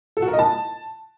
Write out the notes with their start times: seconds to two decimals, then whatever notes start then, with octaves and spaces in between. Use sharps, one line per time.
0.17 A4
0.22 F#4
0.28 A#4
0.33 D#5
0.39 A5